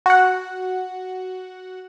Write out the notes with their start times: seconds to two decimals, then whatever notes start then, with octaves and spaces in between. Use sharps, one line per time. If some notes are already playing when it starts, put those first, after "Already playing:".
0.06 F#4 F#5